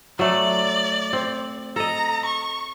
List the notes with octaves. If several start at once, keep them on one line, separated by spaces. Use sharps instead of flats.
F#3 A3 D5
C4
A4 D#5 A#5
C#6